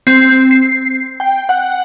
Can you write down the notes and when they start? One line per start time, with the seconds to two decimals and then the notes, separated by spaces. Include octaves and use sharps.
0.07 C4
0.51 C7
1.20 G5
1.49 F#5